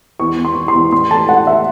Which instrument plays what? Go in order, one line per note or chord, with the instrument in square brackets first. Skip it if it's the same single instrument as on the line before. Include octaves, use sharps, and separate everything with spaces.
[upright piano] E2 C#6
E2
C6
E2
C6
E2
A1 C6
A3 A5
A3 F#5
A3 E5